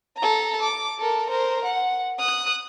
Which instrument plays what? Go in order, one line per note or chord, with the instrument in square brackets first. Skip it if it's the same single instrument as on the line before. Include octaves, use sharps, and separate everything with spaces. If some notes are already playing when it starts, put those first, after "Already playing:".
[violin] A4 A#5
D6
A4 A#4
A#4 C5
F#5
D#6 F#6